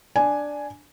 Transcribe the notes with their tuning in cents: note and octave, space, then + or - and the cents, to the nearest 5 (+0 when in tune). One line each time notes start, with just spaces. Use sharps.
D4 +0 G#5 +5